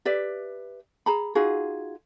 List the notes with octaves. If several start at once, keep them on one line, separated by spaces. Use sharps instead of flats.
G4 B4 D5 E5
G#4 A#5 B5
D#4 F4 F#4 G#4